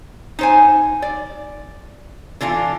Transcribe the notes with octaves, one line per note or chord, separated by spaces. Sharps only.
D#4 C5 G#5
D5
D3 E3 D4 F4